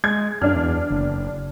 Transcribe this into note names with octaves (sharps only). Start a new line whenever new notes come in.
G#3 G#6
F#2 D4 F6
E2
F#1